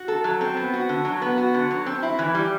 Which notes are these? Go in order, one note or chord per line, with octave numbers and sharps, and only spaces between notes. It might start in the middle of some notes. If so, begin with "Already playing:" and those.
Already playing: F#4
A4
F#3
C4
B3
F#4
D3
F#3
B3
F#4
D3
F#3
C4
E4
E3
G3